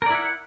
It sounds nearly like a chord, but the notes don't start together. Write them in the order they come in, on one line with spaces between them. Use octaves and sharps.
A#4 D5 E4 F#5